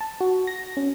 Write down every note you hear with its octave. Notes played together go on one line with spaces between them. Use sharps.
A5
F#4
A#6
C#4